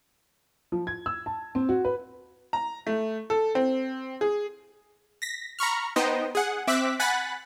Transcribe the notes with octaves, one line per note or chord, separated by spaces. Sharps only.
F3
G#6
E6
A5
C4
F#4
B4
A#5
A3
A4
C4
G#4
A#6 B6
A#5 B5 C#6 F6
B3 D#4 C5 D#5 G5
G#4 F#5
C4 E5 D6 E6 F#6 B6
F#5 G#5 B5 F#6 A6 B6